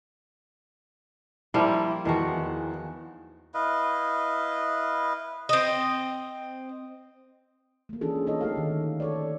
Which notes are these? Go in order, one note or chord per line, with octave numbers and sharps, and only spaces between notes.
F3 G3 A#3 E4
E2 D#3 F3 F#4
E4 B4 D#5 F5
C4 D#5
A3 A#3
E3 C#4 D4 F4 G#4 A4
A#3 D4 D#4 A4 C#5 D#5
A3 G4 A4 F5
D3 D#3
A4 C#5 D5